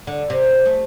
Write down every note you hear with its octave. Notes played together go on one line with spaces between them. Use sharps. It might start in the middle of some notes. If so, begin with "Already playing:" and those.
D3
C3
A3